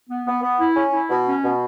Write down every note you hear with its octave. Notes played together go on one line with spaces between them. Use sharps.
B3
B3
B3
E4
C#4
E4
B2
C#4
B2